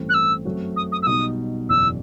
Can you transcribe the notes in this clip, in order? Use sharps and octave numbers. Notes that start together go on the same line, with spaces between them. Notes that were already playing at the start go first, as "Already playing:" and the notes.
Already playing: A1 G2 E3 A3 C4
F#6
E6
F#2 F#3 A3 C4 F#4
D#6
D#6
E6
B1 B2 G3 D#4 D#6
F#1 E2 B2 E6